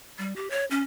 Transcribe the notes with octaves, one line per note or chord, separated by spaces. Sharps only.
G3
G4
C#5
C#4